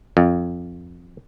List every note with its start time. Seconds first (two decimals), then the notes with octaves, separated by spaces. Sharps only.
0.17 F2